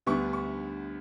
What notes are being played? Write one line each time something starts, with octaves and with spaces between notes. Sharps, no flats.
D2 D3 G3 B3 D4 C#6
C#6